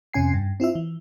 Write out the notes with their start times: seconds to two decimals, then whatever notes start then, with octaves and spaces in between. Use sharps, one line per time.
0.13 F2 C3 C#4 G#5 C7
0.34 G2
0.60 C4 E4 F4 E5
0.75 E3